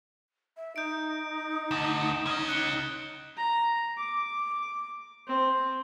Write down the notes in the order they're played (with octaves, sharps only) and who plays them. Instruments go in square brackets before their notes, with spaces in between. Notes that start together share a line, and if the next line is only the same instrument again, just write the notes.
[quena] E5
[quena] D#4 [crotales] G6 D7
[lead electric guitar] D2 [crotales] E7
[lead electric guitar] C#4 D#5
[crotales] F#6 C#7 G7
[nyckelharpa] A#5
D6
C4